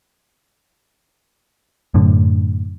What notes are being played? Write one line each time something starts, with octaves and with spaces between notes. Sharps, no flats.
F#2 A2 D3